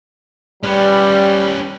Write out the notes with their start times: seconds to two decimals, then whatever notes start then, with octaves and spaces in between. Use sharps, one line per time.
0.63 G3 C#4 B4